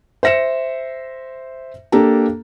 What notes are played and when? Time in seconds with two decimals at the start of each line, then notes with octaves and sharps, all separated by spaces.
0.23 C5 E5 A#6 C#7 E7
1.92 A#3 D4 G4 A4 A#5